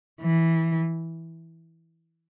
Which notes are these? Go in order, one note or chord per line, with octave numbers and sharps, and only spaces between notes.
E3